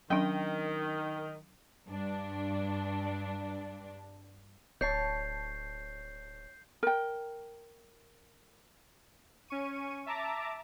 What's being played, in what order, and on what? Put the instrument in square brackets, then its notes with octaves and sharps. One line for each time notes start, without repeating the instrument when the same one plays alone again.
[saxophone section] D#3 [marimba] F#3 C#4 D4 [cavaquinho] D#5 G5
[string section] G2 D4
[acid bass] D1 [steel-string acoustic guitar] C#5 A5 [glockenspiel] G6 C7
[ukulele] A#4 G5
[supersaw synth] C#4 C#6 D#7
E5 A5 A#5 D6